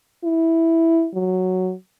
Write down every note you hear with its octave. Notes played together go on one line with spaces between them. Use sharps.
E4
F#3